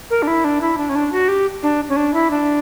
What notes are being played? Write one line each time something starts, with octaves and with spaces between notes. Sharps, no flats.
A#4
D4
E4
D4
E4
D4
C#4
D4
F#4
G4
D4
C#4
D4
E4
D4